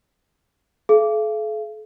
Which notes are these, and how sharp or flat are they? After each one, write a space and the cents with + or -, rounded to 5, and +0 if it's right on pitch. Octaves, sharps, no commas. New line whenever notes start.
A4 -45 F5 -45